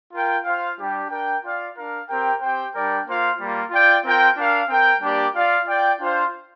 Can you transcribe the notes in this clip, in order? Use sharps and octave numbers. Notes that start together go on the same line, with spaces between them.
F4 A#4 G5
F4 C5 F5
G3 D4 G4
D4 A#4 G5
F4 D5 F5
D4 A#4 F5
C4 G4 A#4 G5
C4 G4 C5 G5
G3 D4 A#4 D5 G5
A#3 F4 C5 F5
G3 A#3 F4
F4 D5 G5
C4 F4 A#4 G5
D4 A#4 F5
C4 A#4 G5
G3 A#3 D4 G4 D5
F4 D5 F5
F4 D5 G5
D4 F4 C5 F5